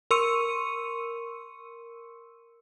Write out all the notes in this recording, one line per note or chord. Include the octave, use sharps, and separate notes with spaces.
A#4 C6 C#6 E6 C#7 D#7